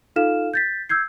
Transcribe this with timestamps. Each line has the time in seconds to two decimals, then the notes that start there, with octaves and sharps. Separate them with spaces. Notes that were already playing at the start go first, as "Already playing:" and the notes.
0.16 D#4 F4 A4 F5 F6 E7
0.54 G6 A6 B6
0.89 E6 G6 G#6 C7